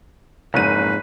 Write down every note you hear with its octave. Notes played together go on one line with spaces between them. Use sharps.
F#1 C2 F2 G#2 B4 D#7